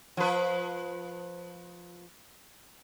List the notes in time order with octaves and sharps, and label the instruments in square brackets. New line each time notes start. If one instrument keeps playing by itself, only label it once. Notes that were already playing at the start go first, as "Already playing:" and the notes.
[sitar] F3 B4